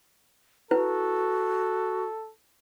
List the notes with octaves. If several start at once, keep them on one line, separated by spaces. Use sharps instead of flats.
E4 F#4 A4 B4